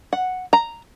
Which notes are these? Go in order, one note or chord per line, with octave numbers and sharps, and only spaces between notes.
F#5
A#5